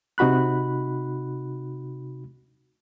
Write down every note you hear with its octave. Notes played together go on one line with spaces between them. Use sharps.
C3 D#4 F#4 B5 F#6